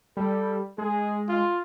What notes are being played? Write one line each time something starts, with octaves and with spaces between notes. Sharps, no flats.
G3 A4
G#3 G#4
F4